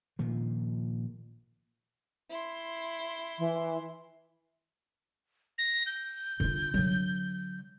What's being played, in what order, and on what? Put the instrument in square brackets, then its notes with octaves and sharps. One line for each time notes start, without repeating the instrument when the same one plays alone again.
[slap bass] A#2 D#3 F3
[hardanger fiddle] E4 C6
[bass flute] E3
[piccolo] A#6
G6
[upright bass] D3 F4
D3 F#3